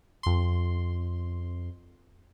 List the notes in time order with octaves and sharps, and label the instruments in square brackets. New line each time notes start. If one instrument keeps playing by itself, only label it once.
[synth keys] F2 C6